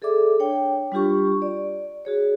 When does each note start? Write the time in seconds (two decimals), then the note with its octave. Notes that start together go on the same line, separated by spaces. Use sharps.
0.02 G#4 A4 D5 E5 D6
0.39 D4 C#5 G5
0.92 G3 D4 F4 G4 C#6
1.42 D5
2.05 F#4 G#4 C#5